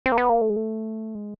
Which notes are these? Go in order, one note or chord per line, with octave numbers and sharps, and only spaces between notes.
C4
A#3
B3
A#3
A3
G#3
A3
G#3